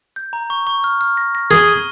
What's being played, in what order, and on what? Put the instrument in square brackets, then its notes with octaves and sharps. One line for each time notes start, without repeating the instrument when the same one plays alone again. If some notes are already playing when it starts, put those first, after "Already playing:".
[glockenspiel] G6
A#5
C#6
C#6
F6
F6
A#6
A#6
[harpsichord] G#4 [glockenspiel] G7
[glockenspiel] D#7